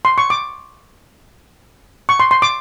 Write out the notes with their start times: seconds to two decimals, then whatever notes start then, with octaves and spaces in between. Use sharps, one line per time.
0.05 C6
0.18 C#6
0.30 D6
2.09 C#6
2.20 C6
2.31 C6
2.42 D6